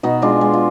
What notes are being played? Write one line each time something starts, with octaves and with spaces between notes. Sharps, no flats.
B2 D#4 F#4
G#3 D4 F4
G#3
F4